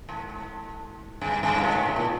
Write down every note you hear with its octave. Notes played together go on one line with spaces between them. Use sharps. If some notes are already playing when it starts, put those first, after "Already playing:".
G#2
G2
G2
G#2
A2
A#2